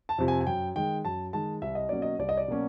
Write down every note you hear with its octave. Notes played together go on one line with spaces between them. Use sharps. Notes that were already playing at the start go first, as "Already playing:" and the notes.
A5
F2 C3 F3
G#5
G#5
F#2 G5
D#3 G#3 G5
F#2 A5
D#3 G#3 A5
C2 E5
D#5
B2 F#3 A#3 C#4 D5
D#5
C2 D5
D#5
D5
B2 F#3 A#3 C#4